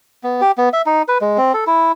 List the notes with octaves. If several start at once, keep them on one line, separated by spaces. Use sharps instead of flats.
B3
G4
B3
E5
D#4
B4
G#3
C4
A4
E4